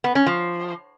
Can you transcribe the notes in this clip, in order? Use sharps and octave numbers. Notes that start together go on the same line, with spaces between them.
B3
C#4
F3